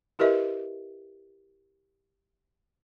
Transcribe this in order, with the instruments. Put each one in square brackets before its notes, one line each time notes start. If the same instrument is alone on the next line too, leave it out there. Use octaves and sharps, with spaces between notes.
[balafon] E4 G4 A#4 B4 D#5 E5